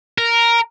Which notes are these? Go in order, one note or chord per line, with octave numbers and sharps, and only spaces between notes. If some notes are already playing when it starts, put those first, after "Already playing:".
A#4